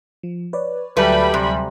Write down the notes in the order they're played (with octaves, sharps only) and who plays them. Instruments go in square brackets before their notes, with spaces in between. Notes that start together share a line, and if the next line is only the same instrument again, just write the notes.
[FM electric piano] F3
B4 C#5 D5
[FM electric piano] D2 F#3 G#5 [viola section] G3 B5 [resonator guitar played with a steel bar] A3 B4
[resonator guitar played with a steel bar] C3